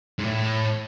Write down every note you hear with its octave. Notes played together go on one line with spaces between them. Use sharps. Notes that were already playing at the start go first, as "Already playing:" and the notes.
G#2
A2